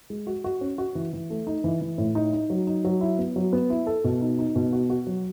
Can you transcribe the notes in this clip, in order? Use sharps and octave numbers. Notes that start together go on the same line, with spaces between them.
G#3
F#4
F#4
C#4
F#4
E3
E3
A3
D#4
E3
E3
A2
D#4
D#4
F#3
D#4
F#3
E4
B3
F#3
B3
E4
A4
B2
D#4
D#4
B2
F#4
F#4
F#3